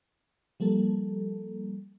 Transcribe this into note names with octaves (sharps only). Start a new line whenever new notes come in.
F3 G3 A#3 A4